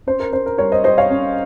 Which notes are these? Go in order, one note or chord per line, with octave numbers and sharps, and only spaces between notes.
C#4 C5
A#4
C#4 C5
A#4
G3 A#4 C#5
C5 D#5
G3 C5 D#5
C#5 F5
C#4